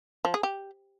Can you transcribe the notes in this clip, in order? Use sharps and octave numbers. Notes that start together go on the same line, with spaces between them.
F3
G#4
G4